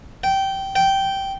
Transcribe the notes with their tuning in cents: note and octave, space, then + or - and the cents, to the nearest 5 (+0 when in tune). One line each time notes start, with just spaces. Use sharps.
G5 -15
G5 -10